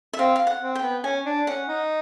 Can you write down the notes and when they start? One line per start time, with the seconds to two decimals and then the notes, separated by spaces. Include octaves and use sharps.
0.13 E5
0.19 C4 F5
0.36 F5
0.47 F#5
0.62 C4
0.75 G5
0.82 B3
1.04 C#4 G#5
1.26 D4
1.47 C#4 F#5
1.68 D#4